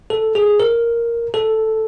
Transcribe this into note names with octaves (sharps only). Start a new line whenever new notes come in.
A4
G#4
A#4
A4